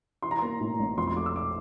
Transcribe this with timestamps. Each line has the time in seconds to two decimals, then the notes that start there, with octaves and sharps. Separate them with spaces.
0.22 E3 C6
0.31 A#5
0.39 A#3 C6
0.60 A2
0.79 A1
0.97 F2 C6
1.07 C6
1.17 A3 D6
1.26 E6
1.36 D6